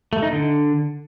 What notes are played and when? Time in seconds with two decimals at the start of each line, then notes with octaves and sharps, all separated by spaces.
0.13 A3
0.22 D#4
0.32 D3